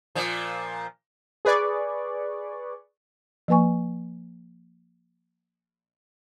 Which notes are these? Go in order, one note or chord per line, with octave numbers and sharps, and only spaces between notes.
A#2 F3
G#4 B4 D5 C#6
F3 A#3 B4 G#5 C#6